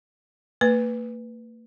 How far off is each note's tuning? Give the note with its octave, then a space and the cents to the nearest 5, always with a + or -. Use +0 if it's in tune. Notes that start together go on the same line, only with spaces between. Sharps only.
A#3 -40 B4 +0